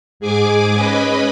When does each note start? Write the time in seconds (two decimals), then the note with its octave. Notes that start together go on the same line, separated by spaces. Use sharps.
0.20 G#2 G#4 G#5 D6
0.74 C#4 B4 D#5 B5